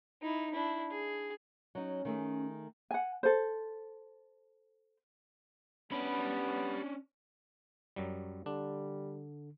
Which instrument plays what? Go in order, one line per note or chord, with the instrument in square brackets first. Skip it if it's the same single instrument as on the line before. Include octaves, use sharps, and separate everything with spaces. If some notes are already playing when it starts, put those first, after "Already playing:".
[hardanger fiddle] D#4 E4
D4 E4
G#4
[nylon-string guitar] F#3 D#4 [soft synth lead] C#4
[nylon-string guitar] D#3 A3 G#4
[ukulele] F#5 G#5
A4 C5
[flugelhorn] B3 [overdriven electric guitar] C#4 D4 [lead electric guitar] G4 B5
[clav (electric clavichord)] F#2 F#3 G3
[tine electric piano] D3 [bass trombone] G3 [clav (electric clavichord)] D4